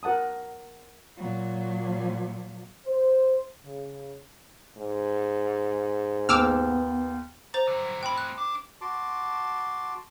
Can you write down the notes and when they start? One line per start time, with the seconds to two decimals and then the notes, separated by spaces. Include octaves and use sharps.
0.03 F#4 A#4 F#5 A5 D#6
1.18 A#2 F#3
2.86 C5
3.64 C#3
4.77 G#2
6.29 D#2 B3 D6 E6 F6
7.54 C5 A#5 A6
7.67 D3 F#3
8.03 A3 C4 G5 B5
8.18 F#6
8.38 D4
8.81 F#4 A5 C6 D6